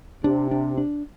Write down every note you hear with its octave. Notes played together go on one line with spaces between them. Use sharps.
C3 D4
D4
D4